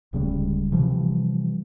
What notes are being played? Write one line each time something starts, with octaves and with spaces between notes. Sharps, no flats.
D1 C#3 G3 G#3
C3 E3 F3 G3